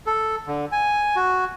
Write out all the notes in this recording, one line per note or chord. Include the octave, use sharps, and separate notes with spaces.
A4
D3
G#5
F#4